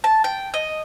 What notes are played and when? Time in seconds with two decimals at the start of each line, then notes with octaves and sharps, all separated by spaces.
0.04 A5
0.24 G5
0.54 D#5